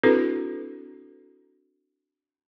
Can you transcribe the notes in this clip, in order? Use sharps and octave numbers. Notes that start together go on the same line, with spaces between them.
C4 D4 E4 F#4 A4 B4